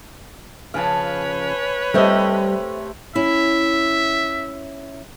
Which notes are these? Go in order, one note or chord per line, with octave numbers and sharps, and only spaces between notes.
C#3 F3 B4 C#5 F5 G#5 A5
C3 G3 A3 A4 C5 D#5 E5
C#4 E4 E5